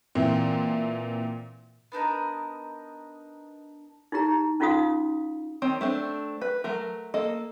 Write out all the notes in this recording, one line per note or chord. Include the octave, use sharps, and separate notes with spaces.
A#2 E3 C4
B3 D4 D#4 A#4
D#4 E4 G4 A#5
C#4 D#4 F4 F#4 F5 D#6
D#3 C4 C#5
A3 C4 D4
B4
F#3 A3 A#4
A#3 A4 D#5